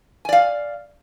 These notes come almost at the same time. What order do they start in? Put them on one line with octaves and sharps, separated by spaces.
G#5 D5 F5